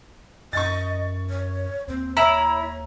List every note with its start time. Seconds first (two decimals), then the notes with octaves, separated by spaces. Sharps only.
0.53 F#2 D#5 C#6 A6
1.30 C#5
1.88 D#2 C4
2.17 E4 C#5 A#5